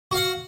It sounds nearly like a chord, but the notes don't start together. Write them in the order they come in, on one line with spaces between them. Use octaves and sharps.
F#4 F5 F#5